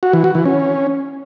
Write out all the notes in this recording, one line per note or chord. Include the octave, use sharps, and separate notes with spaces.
F#4
E3
F#4
E3
C#4